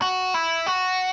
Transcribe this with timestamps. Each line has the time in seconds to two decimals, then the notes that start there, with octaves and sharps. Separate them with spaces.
0.02 F#4
0.34 E4
0.66 F#4